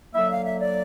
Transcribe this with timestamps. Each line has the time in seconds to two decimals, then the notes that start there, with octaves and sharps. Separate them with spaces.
0.14 D3 F#3 A#3 E5
0.30 F5
0.44 E5
0.59 D5